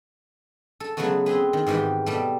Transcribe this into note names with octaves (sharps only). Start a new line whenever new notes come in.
A4
C#3 F#3 G#3 A3 B3 F#4
C4 G#4 B4
D#3
G#2 D#3 E3 F#4 G4
B2 G3 A3